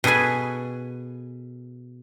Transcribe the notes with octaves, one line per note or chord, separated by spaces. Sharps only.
B2 G#4 A4 B4 G#5